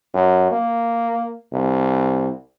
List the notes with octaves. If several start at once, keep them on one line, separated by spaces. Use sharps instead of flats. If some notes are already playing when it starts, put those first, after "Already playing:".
F#2
A#3
C2